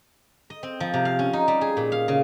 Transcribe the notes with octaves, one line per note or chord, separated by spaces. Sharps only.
D#5
C4
F3
C3
F5
C#4
D#4
G3
G#4
A#2
F5
C#3